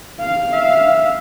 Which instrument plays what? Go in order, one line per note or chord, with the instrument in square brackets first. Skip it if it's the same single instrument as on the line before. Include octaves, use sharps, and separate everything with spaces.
[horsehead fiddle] F5
[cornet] E5